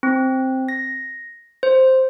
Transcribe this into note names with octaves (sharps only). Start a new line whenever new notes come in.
C4
A#6
C5